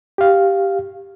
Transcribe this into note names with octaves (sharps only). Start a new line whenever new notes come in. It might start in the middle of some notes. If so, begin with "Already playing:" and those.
G4 F5